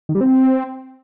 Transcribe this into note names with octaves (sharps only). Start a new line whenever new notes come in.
D#3
G3
C4